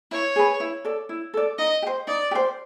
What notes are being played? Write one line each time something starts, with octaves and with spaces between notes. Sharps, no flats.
E4 C#5
G#4 B4
E4
A4 D5
E4
A4 D5
D#4 D#5
G4
C5
D#4 D5
G4
C5